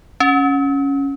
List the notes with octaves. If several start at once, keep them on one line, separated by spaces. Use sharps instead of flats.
C#4